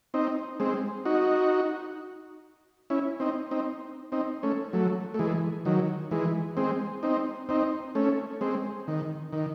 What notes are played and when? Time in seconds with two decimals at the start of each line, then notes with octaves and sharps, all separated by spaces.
0.14 C4 D#4
0.60 G#3 C4
1.05 D#4 F#4
2.90 C#4 E4
3.20 C4 D#4
3.51 C4 D#4
4.12 C4 D#4
4.43 A3 C#4
4.73 F#3 A3
5.14 A3
5.19 E3 G#3
5.65 D#3 F#3
6.11 E3 G#3
6.57 G#3 C4
7.03 C4 D#4
7.49 C4 D#4
7.95 A3 C#4
8.41 G#3 C4
8.88 D#3
9.32 D#3